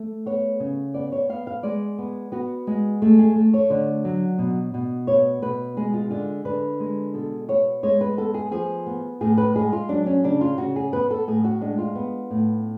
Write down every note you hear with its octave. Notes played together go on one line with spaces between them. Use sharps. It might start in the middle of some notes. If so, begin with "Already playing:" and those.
Already playing: A3
B3 C#5
C#3
B3 D5
C#5
B3 F5
F5
G#3 D5
B3
B3 F#4
G#3
A3 G#4
G#4
A3
C#5
D3
F#3
B2
B2
B3 C#5
B2 B4
G#3 G#4
F4
D3 F4
D3 B4
G#3
B2 A4
B3 C#5
G#3 C#5
B4
B3 A4
G#4
F3 G#4
B3
A2 G#4
B4
G#3 G#4
F4
F#3 D4
C#4
C#3 D4
F4
C#3 F#4
G#4
B3 B4
A4
A2 G#4
F#4
G#3 D4
F4
B3
A2